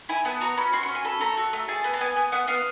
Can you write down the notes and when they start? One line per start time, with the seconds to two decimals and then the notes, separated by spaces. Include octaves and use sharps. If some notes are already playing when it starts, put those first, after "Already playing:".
0.09 E4 G#5
0.25 B3 A5
0.41 F#4 A#5
0.57 C#4 B5
0.73 F#4 C6
0.83 C#6
0.88 C#4
0.95 G#5
1.05 A4 B5
1.21 A3 A#5
1.37 F#4
1.53 A3
1.68 G#4 A5
1.84 B3
1.94 A5
2.01 B3 G#5
2.16 B3
2.32 B3 F#5
2.48 B3 F5